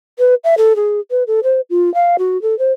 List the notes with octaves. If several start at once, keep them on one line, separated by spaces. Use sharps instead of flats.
B4
E5
A4
G#4
B4
A4
C5
F4
F5
F#4
A4
C5